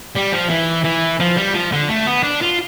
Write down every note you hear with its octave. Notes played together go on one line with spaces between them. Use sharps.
G3
F3
E3
E3
F3
G3
F3
D3
A3
B3
D4
F4